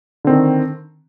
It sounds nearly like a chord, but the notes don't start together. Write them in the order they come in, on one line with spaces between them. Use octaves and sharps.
D3 C4 D#3